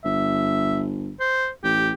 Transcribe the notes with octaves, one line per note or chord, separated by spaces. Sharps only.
G1 E5
C5
A1 G4